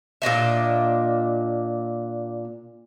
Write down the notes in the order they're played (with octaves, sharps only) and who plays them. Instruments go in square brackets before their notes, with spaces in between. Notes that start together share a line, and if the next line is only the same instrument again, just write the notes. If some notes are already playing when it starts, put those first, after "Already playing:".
[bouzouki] A#2 D4 D#5 E5